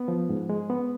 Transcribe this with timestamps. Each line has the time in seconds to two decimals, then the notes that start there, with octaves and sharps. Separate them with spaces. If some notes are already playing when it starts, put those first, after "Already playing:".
Already playing: B3
0.08 F3
0.29 G#2
0.49 G#3
0.70 B3